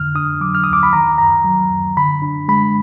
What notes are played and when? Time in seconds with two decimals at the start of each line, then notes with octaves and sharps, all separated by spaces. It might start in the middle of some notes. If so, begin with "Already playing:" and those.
Already playing: F2 D3 F6
0.15 D4 D#6
0.41 F#3 D6
0.55 F6
0.64 D2 D#6
0.73 D6
0.83 B5
0.92 D#3 A#5
1.18 F#2 A#5
1.44 F#3
1.71 F#2
1.97 D3 B5
2.22 D4
2.48 G#3 B5